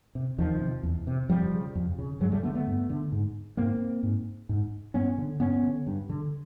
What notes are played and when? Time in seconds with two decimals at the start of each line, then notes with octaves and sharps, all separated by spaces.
0.15 C3
0.38 E2 D#3 F3
0.61 C3
0.83 E2
1.07 C3
1.29 F2 F3 G3
1.53 C#3
1.75 F2
1.99 C#3
2.20 G2 F#3 G#3
2.32 G3 A3
2.43 D3 A3 B3
2.55 A3 B3
2.67 G2
2.90 D3
3.12 G#2
3.57 G#2 A#3 C4
4.03 G#2
4.49 G#2
4.94 G2 B3 C#4
5.18 D3
5.40 G2 B3 C#4
5.63 D3
5.87 G2
6.09 D3